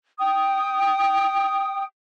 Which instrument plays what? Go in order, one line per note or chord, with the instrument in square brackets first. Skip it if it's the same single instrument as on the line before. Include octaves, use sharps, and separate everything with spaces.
[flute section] G5 D#6